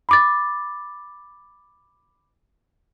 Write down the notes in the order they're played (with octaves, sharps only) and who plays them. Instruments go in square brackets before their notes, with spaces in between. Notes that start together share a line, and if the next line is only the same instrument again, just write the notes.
[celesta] B5 D6 A6